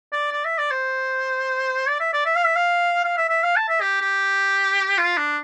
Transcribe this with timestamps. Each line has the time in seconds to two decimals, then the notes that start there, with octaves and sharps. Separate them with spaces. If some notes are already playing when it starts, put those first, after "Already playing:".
0.13 D5
0.32 D5
0.45 E5
0.58 D5
0.71 C5
1.88 D5
2.00 E5
2.13 D5
2.26 E5
2.36 F5
2.45 E5
2.56 F5
3.04 F5
3.17 E5
3.29 E5
3.43 F5
3.56 A5
3.69 E5
3.81 G4
4.02 G4
4.98 F4
5.18 D4